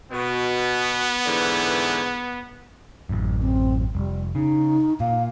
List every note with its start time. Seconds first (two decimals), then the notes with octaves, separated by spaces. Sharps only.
0.11 B2 B3
1.26 G#2 D3 E3
3.09 A1 F#2
3.42 C4
3.95 F1 G3
4.35 C#3 D#4
5.00 A#2 F5